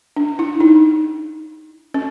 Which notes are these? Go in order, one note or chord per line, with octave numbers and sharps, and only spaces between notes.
D4
E4
D#4
C#4